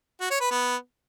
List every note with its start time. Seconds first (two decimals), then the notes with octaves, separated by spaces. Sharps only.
0.21 F#4
0.31 C#5
0.41 B4
0.50 B3